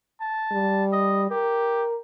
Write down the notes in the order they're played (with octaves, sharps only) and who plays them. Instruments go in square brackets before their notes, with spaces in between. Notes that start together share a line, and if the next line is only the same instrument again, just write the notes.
[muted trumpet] A5
[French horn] G3
[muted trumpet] D#5
[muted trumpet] G4 [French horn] A#4